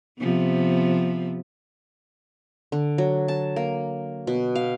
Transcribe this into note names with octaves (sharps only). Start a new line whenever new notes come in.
C3 F3 B3
D3
F#3
A5
A#3
B2
F5